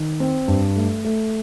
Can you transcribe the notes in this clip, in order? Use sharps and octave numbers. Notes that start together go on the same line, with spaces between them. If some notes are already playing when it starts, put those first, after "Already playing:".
Already playing: D#3
C4
G2
A3
A3